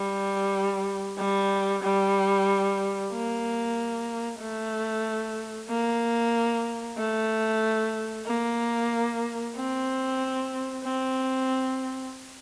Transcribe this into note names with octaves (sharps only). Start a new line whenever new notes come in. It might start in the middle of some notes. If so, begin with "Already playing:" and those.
Already playing: G3
G3
G3
A#3
A3
A#3
A3
A#3
C4
C4